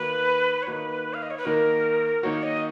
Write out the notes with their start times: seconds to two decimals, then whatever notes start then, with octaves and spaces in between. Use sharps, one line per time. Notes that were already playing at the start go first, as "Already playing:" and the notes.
Already playing: D#3 A#3 D#4 F#4 B4
0.63 C#5
0.67 D#3 A#3 D#4 F#4 B4
1.14 F5
1.22 D#5
1.30 C#5
1.38 B4
1.45 D#3 A#3 D#4 F#4 A#4
2.23 D#3 A#3 D#4 F#4 C#5
2.43 D#5